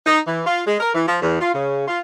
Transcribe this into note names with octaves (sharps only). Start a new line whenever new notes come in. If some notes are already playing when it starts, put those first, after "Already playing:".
D#4
E3
F4
G#3
A#4
E3
F3
E2
F4
C#3
F4